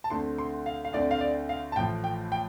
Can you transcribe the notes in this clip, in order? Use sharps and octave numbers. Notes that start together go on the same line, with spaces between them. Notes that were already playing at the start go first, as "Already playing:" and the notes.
A5
D2 D3 A3 C4 C6
C6
F5
F5
D2 D3 A3 C4 D5
F5
D5
F5
A5
A1 A2 F3 G5
G5
G5